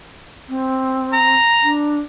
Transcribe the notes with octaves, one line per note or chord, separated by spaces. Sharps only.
C4
A#5
D4